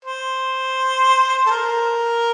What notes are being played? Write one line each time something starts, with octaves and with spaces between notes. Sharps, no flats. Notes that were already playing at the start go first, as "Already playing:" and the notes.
C5
A4
A#4